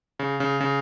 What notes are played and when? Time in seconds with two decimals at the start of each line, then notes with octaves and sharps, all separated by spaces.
0.19 C#3
0.40 C#3
0.61 C#3